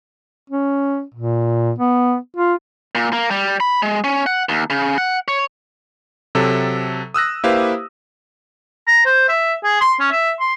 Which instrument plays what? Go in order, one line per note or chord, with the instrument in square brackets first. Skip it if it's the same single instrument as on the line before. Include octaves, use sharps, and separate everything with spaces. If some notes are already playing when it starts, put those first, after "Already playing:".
[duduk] C#4
A#2
B3
F4
[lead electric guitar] A#2
A#3
G3
B5
G#3
C#4
F#5
D#2
C#3
F#5
C#5
[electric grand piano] C3 F#3 A4
D#6 E6 F#6 A#6
A#3 E4 G4 B4 C5 F5
[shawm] A#5
C5
E5
G#4
C6
C#4
E5
C6